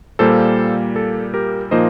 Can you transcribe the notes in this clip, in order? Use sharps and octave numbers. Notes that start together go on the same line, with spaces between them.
A#2 G3 A#3 A4 C5
A4
G4 A#4
A#2 F3 A#3 D#4 C5 D#5